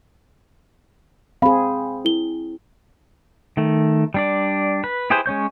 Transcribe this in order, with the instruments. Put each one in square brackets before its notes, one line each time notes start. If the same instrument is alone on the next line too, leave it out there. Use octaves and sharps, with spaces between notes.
[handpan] C4 G#4 [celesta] F5 B5
[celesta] E4 G7
[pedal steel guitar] D#3 A3
G3 D4 D5
B4
E4 G4 G#4 B4 C5
G#3 C#4 C#5 G6